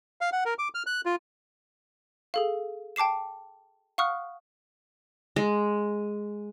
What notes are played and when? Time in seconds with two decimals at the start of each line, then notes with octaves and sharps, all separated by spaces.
0.21 F5
0.32 F#5
0.45 A#4
0.59 D6
0.75 F6
0.87 F#6
1.06 F4
2.34 G#4 A4 F5
2.96 G5 A5 D6 C7 E7
3.98 F5 F#5 C#6 D#6 F6 F#6
5.36 G#3